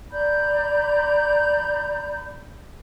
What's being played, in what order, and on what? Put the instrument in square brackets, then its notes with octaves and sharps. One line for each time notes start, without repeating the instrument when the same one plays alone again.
[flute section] D5 A#5 B5 G6